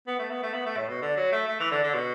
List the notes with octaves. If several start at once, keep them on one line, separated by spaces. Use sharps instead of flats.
B3
A3
B3
A3
B3
A3
A2
B2
D3
F#3
A3
A3
E3
D3
D3
B2